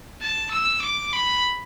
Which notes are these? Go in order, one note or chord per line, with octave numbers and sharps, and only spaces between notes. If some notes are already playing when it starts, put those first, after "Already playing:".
A5
E6
D6
B5